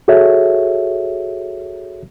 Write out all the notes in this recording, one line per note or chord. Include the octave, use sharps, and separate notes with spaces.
F#4 G#4 A4 C#5 E5